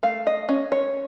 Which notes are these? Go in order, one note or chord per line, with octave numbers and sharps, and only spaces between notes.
A3 F5
D#5
C#4 D#5
C#5